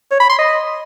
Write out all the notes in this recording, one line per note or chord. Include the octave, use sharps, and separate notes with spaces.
C#5
B5
C6
D#5